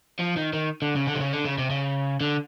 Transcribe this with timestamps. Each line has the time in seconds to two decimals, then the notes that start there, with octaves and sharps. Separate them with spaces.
0.19 F3
0.37 D#3
0.53 D#3
0.82 D3
0.95 C#3
1.07 D3
1.15 C3
1.20 C#3
1.32 D3
1.45 C#3
1.58 C3
1.70 C#3
2.21 D3